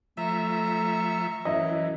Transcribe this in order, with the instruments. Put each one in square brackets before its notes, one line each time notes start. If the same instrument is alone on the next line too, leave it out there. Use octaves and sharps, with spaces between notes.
[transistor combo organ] F3 E5 [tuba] A3 [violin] A#5 C#6
[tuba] F#2 [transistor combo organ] E3 [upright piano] D#5 E5